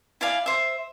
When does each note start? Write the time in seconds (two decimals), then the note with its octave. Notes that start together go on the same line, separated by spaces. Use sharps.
0.21 E4 D5 F5 G#5
0.46 C5 E5